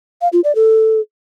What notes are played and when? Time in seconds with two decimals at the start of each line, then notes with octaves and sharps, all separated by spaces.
0.21 F5
0.33 F4
0.44 D5
0.55 A4